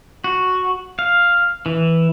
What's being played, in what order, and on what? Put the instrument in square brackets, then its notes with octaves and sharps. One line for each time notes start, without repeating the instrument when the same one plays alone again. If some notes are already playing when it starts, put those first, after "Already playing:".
[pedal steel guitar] F#4
F5
E3